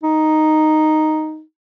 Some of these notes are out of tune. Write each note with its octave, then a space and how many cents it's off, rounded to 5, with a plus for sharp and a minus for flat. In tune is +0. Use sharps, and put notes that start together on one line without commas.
D#4 +0